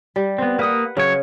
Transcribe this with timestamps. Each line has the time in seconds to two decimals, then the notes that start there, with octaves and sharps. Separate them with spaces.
0.16 G3
0.38 B3 C4
0.59 A#3 B4 F#5 D#6
0.97 C#3 F#3 C#4 C#5